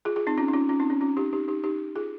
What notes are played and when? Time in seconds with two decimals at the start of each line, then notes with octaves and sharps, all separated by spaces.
0.05 F4 G#4
0.16 F4 G#4
0.27 C4 D#4
0.38 C#4 F4
0.48 D#4
0.53 C#4 F4
0.69 C#4 F4
0.80 C4 D#4
0.90 C#4
1.01 C#4 F4
1.17 D#4 G4
1.33 D#4 G4
1.48 D#4 G4
1.64 D#4 G4
1.95 F4 G#4